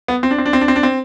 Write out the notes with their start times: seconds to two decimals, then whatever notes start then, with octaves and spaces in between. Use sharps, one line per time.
0.08 B3
0.23 C4
0.31 D4
0.38 C4
0.46 D4
0.53 C4
0.61 D4
0.68 C4
0.76 D4
0.83 C4